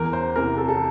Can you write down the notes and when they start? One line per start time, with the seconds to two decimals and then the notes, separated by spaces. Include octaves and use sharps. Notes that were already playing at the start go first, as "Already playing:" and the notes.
Already playing: E2 A#4
0.13 C5
0.35 C3 E3 A#4
0.58 A4
0.68 A4